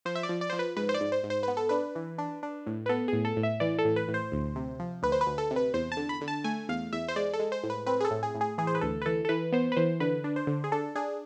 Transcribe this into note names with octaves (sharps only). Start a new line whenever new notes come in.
F3 C5
E5
D5
F3
D5
F3 C5
B4
G#2 B4
C5
D5
G#2
C5
G#2
C5
B3 B4
A4
D4 B4
E3
D4
D4
A2
B4
B3 A4
A2 G#4
A4
A2
E5
E3 D5
A4
A2
B4
A2
C5
D2
C3
F3
D2 B4
C5
B4
D2
A4
C3
B4
E2 C5
A5
D3
B5
D3
A5
A3 G#5
E2 F5
E2 E5
C5
G#3 D5
A4
G#3
C5
A2
B4
C4 B4
G#4
A4
A2
G#4
A2
G#4
E3 G#4
C5
B4
D2 A4
B4
E3 A4
A4
E3 B4
B3 C5
B4
E3 C5
D3 B4
D4
C5
D3
G#4
D4 A4
D4 G#4